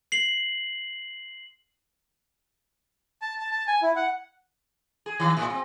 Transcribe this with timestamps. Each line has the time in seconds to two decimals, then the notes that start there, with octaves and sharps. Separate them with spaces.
0.12 C7 F#7
3.22 A5
3.39 A5
3.51 A5
3.67 G#5
3.82 E4
3.96 F#5
5.06 G#4
5.20 D#3
5.37 A2
5.50 C4